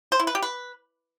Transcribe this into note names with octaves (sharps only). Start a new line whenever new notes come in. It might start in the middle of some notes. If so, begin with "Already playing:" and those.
C5
E4
B4
G4
B4